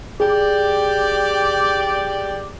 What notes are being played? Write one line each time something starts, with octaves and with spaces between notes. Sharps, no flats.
G4 G#4 D5